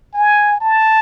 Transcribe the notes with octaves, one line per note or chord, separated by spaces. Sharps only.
G#5
A5